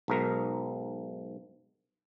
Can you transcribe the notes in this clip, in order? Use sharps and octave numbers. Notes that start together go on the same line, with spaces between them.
B1 G#2 A#4